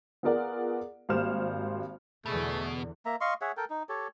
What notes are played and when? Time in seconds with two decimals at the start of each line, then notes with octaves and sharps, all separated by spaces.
0.23 B3 F4 G#4 A#4 D5 F#5
1.09 G#1 G3 A#3 C5 F6 E7
2.26 E2 B2 D3 A3 G#4
3.06 A#3 E5 A#5
3.21 D#5 F5 C6 C#6
3.41 G#4 C#5 E5 F#5
3.57 A4 A#4 G5
3.70 D#4
3.89 G4 A4 C#5